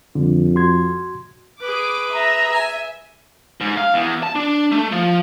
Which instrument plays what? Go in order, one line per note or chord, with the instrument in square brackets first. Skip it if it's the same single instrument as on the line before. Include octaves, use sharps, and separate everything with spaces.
[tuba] F2 [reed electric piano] D3 G3
[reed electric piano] F#4 C6 G#6
[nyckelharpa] G#4 B4 [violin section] D6
[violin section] E5 [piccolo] A#5
[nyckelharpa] G#5
[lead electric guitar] G#2
F5
E2
A5
D4
A3
F3